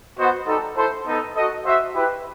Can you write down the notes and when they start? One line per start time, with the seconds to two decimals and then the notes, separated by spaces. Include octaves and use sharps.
0.18 B3 F#4 C5 D#5 F#5
0.47 G3 D#4 A4
0.76 E4 A4 C5
1.06 B3 D#4 A4
1.35 F#4 A4 D#5
1.65 F#4 C5 E5
1.94 E4 G4 B4